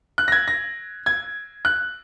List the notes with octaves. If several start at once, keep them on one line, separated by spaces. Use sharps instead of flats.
F#6
A#6
G#6
A#6
G#6
F#6